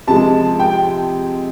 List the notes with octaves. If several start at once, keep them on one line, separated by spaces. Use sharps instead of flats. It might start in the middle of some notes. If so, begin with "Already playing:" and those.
C3 F3 G#3 A5
G5